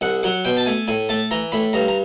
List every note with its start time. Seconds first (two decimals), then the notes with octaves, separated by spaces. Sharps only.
0.01 C2 F#5
0.23 F#3 F#5
0.45 B2 G5
0.57 A5
0.66 A3 G#5
0.88 A2 G#5
1.09 A3 A5
1.31 E3 A#5
1.52 A2 B5
1.73 G2 A#5
1.88 A#5